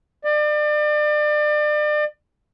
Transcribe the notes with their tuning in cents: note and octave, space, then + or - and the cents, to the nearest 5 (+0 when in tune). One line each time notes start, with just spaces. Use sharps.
D5 +35